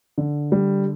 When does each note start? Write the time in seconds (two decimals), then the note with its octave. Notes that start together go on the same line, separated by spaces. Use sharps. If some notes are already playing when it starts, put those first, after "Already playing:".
0.18 D3
0.52 G3